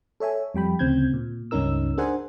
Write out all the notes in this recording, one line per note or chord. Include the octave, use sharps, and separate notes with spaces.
A4 C#5 E5 G#5
F2 G3 G5 B5
D2 C#3 C4 G6 G#6
A#2
C#2 G2 C#4 D#4 A#4 E6
D4 G#4 A#4 C5 F#5 G#5